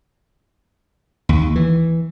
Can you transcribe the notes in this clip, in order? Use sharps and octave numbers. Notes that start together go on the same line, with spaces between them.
D#2
E3